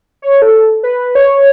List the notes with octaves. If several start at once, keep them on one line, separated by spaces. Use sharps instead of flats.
C#5
A4
B4
C#5